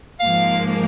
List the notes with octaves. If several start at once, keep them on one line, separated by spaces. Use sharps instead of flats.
G#2 F3 A#3 F5